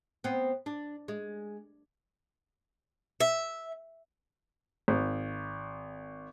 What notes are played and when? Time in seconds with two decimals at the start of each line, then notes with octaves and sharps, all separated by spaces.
0.24 B3 C4
0.66 D4
1.08 G#3
3.20 E5
4.88 G#1